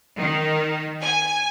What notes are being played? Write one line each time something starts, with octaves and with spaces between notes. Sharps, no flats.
D#3
G#5